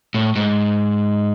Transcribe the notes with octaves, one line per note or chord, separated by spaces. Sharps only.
A2
G#2